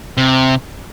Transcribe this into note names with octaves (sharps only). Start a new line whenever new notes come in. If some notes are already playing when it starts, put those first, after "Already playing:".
C3